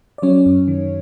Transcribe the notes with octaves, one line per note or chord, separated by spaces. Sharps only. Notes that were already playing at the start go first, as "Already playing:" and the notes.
D5
F#3 C#4 C#5
F#2
D#3